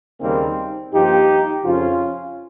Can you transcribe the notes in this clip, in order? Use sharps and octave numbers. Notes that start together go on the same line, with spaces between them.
D#2 C#3 G3 A#3 C4 D#4
G2 F3 A#3 D#4 G4
F2 C#3 F3 C#4 F4